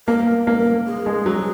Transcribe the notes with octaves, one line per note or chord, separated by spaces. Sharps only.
A#3 A#4
A#3
G#4
G#3
F#3